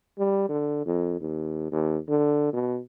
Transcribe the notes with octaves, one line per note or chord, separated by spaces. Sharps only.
G3
D3
F2
D#2
D#2
D3
B2